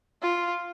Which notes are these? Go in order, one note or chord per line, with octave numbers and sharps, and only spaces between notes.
F4